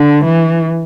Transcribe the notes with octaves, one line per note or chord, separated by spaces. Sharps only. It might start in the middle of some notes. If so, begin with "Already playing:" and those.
Already playing: D3
E3